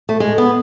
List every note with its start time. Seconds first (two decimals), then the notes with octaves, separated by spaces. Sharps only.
0.09 A3
0.20 G#3
0.38 B3